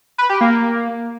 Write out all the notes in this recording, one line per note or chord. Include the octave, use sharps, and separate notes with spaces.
B4
G4
A#3
A#3